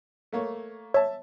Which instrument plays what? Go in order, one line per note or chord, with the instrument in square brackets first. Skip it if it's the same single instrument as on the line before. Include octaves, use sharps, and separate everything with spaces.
[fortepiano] A3 A#3 C#5
[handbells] C#5 [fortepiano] E5 A5